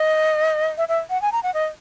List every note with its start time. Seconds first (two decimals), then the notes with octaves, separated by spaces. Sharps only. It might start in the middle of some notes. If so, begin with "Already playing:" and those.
Already playing: D#5
0.77 E5
0.88 E5
1.10 F#5
1.22 G#5
1.32 A#5
1.43 F#5
1.54 D#5